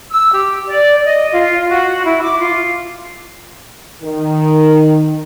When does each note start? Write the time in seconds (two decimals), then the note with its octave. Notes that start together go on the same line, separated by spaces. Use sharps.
0.10 E6
0.33 G4
0.68 D5
1.05 D#5
1.33 F4
1.69 F#4
2.05 E4
2.23 D6
2.40 F4
4.02 D#3